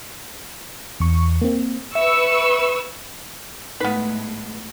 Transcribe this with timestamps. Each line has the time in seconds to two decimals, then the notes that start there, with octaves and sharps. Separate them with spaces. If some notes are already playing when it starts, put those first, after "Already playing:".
1.00 E2 C#6
1.41 A#3 C4
1.95 B4 E5 C#6 E6
3.80 A2 G#3 A3 B3 D#4 B4